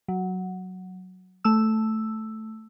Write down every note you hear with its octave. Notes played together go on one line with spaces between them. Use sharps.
F#3
A3 E6